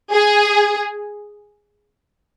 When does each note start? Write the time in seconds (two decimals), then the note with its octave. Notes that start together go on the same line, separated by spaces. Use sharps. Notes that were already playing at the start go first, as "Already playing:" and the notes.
0.12 G#4